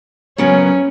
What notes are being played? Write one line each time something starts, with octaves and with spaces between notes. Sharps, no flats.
F#2 C#3 F#3 B3 C#4